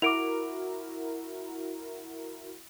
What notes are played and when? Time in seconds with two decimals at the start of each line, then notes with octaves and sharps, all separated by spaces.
0.02 E4 F#4 A#4 D6 D7 F7